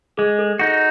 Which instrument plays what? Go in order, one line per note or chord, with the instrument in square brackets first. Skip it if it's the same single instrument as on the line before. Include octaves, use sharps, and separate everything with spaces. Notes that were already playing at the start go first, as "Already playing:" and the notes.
[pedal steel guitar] G#3 [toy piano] G#4
[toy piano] A4
[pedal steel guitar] D#4 F#4 [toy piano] A4